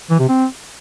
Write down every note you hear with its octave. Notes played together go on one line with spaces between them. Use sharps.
E3
C3
C4